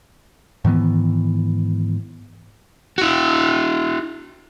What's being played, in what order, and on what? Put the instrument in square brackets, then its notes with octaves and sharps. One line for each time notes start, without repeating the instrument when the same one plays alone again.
[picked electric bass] G#2 D#3 E3 B3
[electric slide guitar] E4 F#4